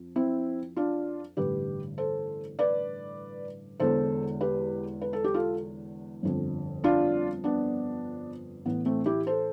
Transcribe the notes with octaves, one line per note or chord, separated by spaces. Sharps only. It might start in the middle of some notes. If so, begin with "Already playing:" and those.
Already playing: F2
C4 E4
D4 F4
A1 G2 D3 G4 B4
A4 C5
B4 D5
E1 E2 D3 A4 C5
G4 B4
B4
A4
G4
F4 A4
G1 F2 D3
D4 F4
B3 D4
A1 A2 E3 B3
A3 C4
E4 G4
A4 C5